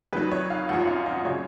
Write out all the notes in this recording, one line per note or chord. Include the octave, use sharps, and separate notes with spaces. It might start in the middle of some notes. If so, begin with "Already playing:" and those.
F2 D#3 F#3 B4
C#5
F5
G#1 F#2 F3 F#5
F5
D#5
C#3 F#3 C#5